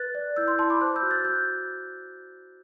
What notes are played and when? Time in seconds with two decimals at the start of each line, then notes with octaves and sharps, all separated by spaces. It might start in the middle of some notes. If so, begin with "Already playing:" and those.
Already playing: B4 F#6 A6
0.15 D5
0.36 E4 E6 G6
0.48 C6 E6
0.59 E4 A5 C6
0.70 B5 D6
0.81 C5 D6 F#6
0.96 E6 G6
1.03 F#4
1.11 F#6 A6
1.24 F#4 E6 G6